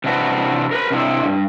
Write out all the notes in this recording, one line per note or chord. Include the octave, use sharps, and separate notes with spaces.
C3 E3 D4 F#4 B4
A#4 B4
C3 D4 E4
G2